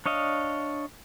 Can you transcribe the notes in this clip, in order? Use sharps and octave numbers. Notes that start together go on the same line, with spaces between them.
D4 C#5 D#5 F5